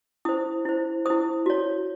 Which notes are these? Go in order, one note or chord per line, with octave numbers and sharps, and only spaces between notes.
E4 C5 D#6
E4 C5
E4 C5 D#6
F#4 C#5